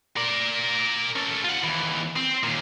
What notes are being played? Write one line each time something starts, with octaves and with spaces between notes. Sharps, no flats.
A#4 D5
C#4 A4
F4 F#5
D#2 E3
C4
D#2 A#2